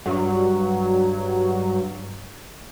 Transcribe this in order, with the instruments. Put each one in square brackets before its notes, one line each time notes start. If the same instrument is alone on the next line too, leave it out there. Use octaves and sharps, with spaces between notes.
[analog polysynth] G2 F#3